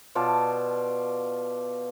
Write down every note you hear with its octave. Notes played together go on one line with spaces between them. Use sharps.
B2 F4 D5 A5